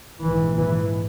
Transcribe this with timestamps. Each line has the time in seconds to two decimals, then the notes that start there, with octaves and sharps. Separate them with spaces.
0.21 A#1 G#2 E3
0.57 E3